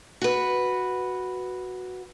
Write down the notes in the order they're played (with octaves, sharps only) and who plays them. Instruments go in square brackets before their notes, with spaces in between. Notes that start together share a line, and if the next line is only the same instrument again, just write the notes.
[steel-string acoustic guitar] F#4 B4